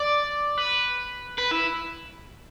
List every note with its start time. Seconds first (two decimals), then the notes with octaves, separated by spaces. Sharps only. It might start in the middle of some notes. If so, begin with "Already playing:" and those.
Already playing: D5
0.58 B4
1.38 B4
1.52 E4